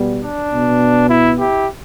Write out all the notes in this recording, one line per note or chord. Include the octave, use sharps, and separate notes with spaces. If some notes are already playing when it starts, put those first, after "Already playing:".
Already playing: B2 G3 B3
D4
B2 B3
E4
E4 G4